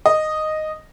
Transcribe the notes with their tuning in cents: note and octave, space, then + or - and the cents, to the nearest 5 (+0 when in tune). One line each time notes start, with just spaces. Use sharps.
D#5 -5